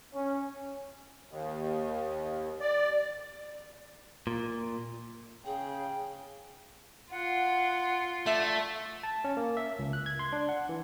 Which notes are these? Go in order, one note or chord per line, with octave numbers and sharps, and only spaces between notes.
C#4
D#2
D5
A#2
C#3 G#4 G5
F4 F#5
A3 D5 E5
A5
C#4
A#3
E5
C#2
F#6
G#6
C6
D4
F#5
E3